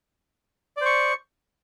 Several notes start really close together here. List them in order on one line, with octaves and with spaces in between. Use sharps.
D5 C5 C#6